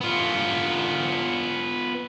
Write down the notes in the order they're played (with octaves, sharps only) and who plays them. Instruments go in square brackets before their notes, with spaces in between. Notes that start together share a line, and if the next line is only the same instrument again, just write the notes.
[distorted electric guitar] B3 F4